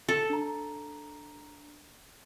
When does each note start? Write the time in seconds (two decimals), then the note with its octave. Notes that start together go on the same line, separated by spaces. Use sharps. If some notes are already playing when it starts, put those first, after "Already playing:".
0.09 A4
0.30 D4 A#5